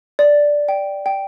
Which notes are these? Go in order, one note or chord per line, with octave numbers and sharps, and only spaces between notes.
D5
G5
G5